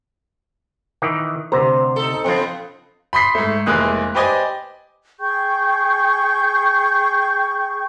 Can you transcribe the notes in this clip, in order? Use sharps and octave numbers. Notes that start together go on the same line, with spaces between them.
D#3 E3
D2 C3 C5 A#5
D#4 A4
C#3 F3 B3 C4 F4
B5 C6 D#6 B6 C7
G#2 A3
F1 E3 G#3 A#3 D#6 F#6
G4 B4 C5 D5 D#5 G#5
G#4 G5 C#6 G6